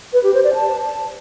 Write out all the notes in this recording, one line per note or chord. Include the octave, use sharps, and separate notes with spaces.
B4
G4
C5
D5
A5